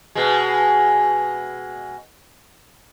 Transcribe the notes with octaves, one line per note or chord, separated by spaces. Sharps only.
B2 G#3